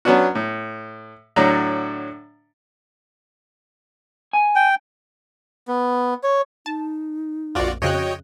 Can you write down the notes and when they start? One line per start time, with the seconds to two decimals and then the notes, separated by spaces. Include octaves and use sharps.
0.05 F#3 B3 C#4 D4 F#4
0.35 A2
1.36 A2 D3 F#3 D5 A#5
4.33 G#5
4.56 G5
5.68 B3
6.23 C#5
6.66 D#4 A5
7.55 A#1 F2 F4 F#4 D5
7.82 F2 C#3 F#4 C#5 D#5 G5 F#6